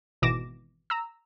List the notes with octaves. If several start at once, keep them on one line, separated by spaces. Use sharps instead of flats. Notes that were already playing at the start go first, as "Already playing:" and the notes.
G#1 B2 E3 D6 A#6 E7
A#5 E6